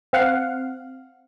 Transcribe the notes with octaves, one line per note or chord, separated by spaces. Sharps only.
C4 F5 F#5